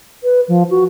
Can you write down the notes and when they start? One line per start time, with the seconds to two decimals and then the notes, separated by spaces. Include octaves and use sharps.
0.23 B4
0.48 F3
0.70 F#4